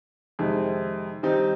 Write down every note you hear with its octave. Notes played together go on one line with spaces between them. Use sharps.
F2 C3 D#3 G#3
D#3 G3 C4 D#4